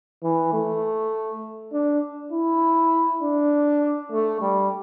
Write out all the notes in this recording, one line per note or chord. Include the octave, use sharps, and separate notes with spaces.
E3
A3
D4
E4
D4
A3
G3